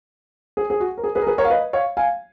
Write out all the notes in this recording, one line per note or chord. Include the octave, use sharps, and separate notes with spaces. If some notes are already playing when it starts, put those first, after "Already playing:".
G#4
G#4
F#4
A#4
G#4
G#4 B4
A#4
G#4 B4
A#4 C#5
F5
B4 D#5
C#5 F5
F5 G#5